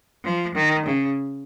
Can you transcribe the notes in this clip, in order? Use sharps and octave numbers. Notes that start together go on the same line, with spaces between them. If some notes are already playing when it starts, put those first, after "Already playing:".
F3
D#3
C#3